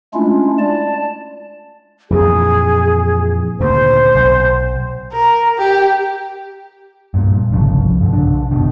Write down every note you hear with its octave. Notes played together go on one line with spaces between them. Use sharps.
G#3 A3 C#4 D4 E4 F4
D5 A5
F2 A#2 E3 G#4
D2 A#2 C#3 C5
B1
A#4
G4
G2 A#2
G1 C2 C#3 F3
G2 D3 E3 F3
B1 C#3 D4
F#1 C#2 B2 D#3